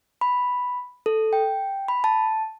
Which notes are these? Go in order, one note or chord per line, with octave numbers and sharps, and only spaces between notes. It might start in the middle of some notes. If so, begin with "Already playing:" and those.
B5
A4
G5
B5
A5